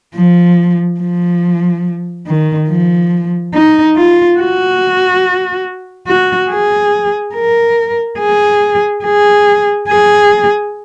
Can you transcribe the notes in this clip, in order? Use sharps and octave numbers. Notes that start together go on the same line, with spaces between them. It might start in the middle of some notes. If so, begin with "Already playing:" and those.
F3
F3
D#3
F3
D#4
F4
F#4
F#4
G#4
A#4
G#4
G#4
G#4